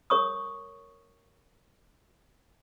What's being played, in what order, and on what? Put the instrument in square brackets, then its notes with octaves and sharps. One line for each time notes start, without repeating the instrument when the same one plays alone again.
[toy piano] A#4 C#5 C#6 D#6